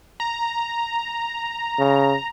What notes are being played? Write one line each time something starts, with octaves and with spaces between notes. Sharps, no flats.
A#5
C#3